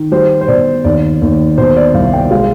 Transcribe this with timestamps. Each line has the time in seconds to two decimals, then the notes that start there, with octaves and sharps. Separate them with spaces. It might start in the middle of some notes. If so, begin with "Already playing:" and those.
Already playing: D#3
0.11 G3 C5
0.41 C5
0.48 B2 D5
0.85 D#2 D5
1.22 D#2
1.58 B2 C5
1.76 D5
1.94 C2 F5
2.13 G5
2.31 G#3 F5